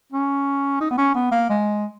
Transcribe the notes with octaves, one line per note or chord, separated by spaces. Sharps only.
C#4
D#4
B3
C#4
B3
A#3
G#3